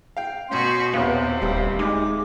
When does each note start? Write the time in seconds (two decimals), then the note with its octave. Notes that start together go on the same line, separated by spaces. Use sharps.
0.17 F5 G5
0.49 B2 C#4 F#4 C6 G6
0.93 A#1 D#2 C3 B3 C#4 F5
1.42 D#1 G3
1.79 G#3 D#4 D6